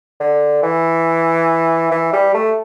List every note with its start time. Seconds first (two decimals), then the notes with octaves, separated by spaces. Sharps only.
0.20 D3
0.63 E3
1.92 E3
2.13 G3
2.34 A3